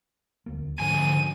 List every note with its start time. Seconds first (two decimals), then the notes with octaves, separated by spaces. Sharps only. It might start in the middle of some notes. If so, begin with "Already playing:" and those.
0.46 D#1 D2 A#3
0.79 D2 G#2 F3 C#4 G#5 D#7